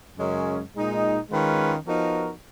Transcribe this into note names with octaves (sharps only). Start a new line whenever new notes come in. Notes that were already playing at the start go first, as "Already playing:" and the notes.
F#2 C#3 G#3 C#4
A#2 G#3 D#4
D#3 G#3 C#4 F4 B4
F3 B3 D#4 F#4 A#4